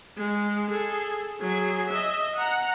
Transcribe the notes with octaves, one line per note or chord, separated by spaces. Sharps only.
G#3
G#4 A4
F#3 G#4
D#5 E5
F#5 A#5